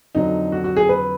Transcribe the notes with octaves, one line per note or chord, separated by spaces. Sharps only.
F2 D3 F#3 D#4
F#4
F#4
G#4
B4